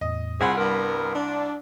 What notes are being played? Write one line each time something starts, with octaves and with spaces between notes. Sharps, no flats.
E2 A2 D#5
C2 C4 F4 G#4 F#5 B5 C6
G2 B3 A#4
D4